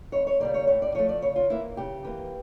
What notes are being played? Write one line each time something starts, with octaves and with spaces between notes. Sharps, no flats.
F2 C#5
C#5
C#3 G3 A#3 D5
C#5
A2 C#5
D5
F3 A3 C#5
D5
C#3 C#5
F4
E3 A#3 E4
C#3 G4
E3 A#3